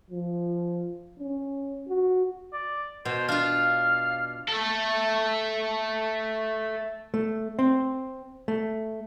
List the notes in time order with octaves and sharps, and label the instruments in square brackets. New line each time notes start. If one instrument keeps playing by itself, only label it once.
[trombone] F3
C#4
F#4
[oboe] D5
[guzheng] B2 [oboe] C5
[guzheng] D4 F4 [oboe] F5
[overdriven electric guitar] A3 A4
[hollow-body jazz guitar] A3
C4
A3